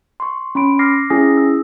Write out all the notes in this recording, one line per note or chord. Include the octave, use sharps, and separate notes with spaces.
C6 C#6
C#4 B5 C6 D7
D6 F6 A#6 C7
C#4 E4 G#4 G#5 D#6 A#6
E6